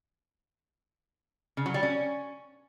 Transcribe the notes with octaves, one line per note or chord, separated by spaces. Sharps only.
C#3
F#3
G3
C#4